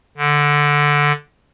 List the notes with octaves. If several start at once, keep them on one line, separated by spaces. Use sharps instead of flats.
D3